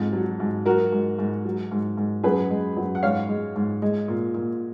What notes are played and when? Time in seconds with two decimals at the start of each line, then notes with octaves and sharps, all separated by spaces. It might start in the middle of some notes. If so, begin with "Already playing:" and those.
Already playing: F2 G#2
0.13 F#3
0.40 G#2
0.66 F#3 F#4 A#4
0.92 G#2
1.19 G#2
1.45 F#3
1.71 G#2
1.97 G#2
2.23 F#2 G#4 B4
2.50 G#3
2.77 F#2
2.95 F#5
3.03 G#2 C#5 F5
3.29 G#3
3.56 G#2
3.82 G#3
4.08 A#2
4.34 A#2